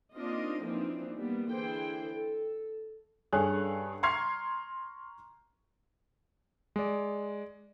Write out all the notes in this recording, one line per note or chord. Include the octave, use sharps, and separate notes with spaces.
A#3 C4 D4 D#4 F4 D#5
E3 F3 A#3 C4 D4 D#4
G3 A#3 B3
D3 E3 G#4 C5 G5
A4
G2 C#4 G#4 A4 F#6
A#5 C6 C#6 F6 G#6 C7
G#3 D5